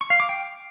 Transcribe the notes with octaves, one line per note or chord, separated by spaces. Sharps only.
C#6
F5
D6
G5